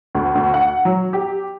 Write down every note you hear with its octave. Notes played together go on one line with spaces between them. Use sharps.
D2
D2
F#5
F#3
G4